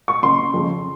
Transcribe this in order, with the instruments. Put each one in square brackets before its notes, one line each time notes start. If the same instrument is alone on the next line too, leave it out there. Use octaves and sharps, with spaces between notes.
[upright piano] C#6
F#1 C6
F2 C#3